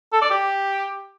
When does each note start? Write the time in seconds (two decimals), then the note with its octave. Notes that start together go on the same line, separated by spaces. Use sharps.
0.13 A4
0.22 D5
0.30 G4